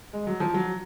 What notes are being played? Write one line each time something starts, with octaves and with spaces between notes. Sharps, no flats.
G#3
F#3
F3
F#3